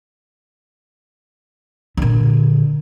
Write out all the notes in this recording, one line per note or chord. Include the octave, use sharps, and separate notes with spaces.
A#2 D3